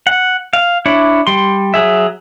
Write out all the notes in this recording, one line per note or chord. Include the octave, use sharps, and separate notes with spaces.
F#5
F5
D4 E4 C#5
G3 C6
F#3 G#4 E5